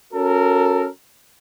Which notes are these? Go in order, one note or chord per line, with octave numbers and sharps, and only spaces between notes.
C#4 F#4 A4 A#4